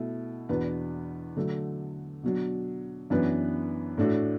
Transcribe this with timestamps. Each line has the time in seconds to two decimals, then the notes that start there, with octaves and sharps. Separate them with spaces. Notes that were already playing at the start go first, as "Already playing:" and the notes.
Already playing: B2 A3 E4
0.49 E2 B2 B3 D4 B4
1.36 D3 F#3 A3
2.23 B2 F#3 D4
3.10 F#2 E3 B3 D4 B4
3.98 A2 A3 D4 F#4